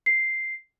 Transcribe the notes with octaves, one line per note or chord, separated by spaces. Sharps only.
C7